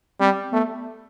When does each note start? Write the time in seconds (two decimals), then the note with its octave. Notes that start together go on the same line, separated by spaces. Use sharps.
0.20 G3 C4
0.52 A3 B3